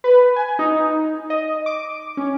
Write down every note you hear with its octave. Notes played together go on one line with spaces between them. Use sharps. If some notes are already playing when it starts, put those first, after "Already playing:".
B4
G#5
D#4
D#5
D6
C#4